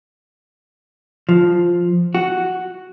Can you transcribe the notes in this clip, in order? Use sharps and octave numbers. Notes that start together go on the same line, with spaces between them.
F3
F#4